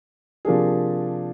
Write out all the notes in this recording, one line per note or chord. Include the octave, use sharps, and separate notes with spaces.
C3 F3 A#3 D4 G#4